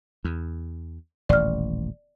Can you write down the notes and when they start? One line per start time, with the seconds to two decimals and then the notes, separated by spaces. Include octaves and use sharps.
0.25 E2
1.29 D#1 A1 D5 F6